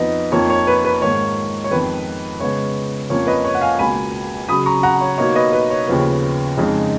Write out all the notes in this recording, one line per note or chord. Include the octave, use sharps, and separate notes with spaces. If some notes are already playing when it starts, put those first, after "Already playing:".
Already playing: F2 F3 B3 D#4 D#5
F2 F3 A#3 D#4 C#5
C#5
B4
B4
G#2 D#3 A#3 C#5
C#5
F2 D#3 G#3 B3 B4
C#3 G#3 B3 C#5
F2 F3 A#3 C#4 C#5
B4 D#5
C#5
F#5
F5 G#5
C#2 B2 A#3 G#5 B5
C#3 F#3 C#4 B5 D#6
A#5 C#6
F#5 A#5
C#5
B2 A#3 D#4 C#5
B4 D#5
B4
C#5
D#2 C#3 F3 B3
F2 C#3 G#3 D#4